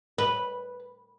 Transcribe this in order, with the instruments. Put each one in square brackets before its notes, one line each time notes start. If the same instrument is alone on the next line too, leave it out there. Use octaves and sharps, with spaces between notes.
[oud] B4